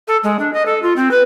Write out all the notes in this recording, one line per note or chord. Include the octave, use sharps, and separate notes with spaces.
A4
G#3
D4
D#5
A4
F4
C4
B4